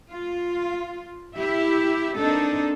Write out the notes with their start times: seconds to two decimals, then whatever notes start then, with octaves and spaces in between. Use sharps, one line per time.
0.11 F4
1.34 E4 G4 E5
2.17 A#3 C4 D4 D#4 A4